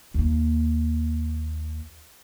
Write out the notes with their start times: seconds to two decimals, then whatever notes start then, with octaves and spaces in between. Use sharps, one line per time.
0.14 D#2 A#3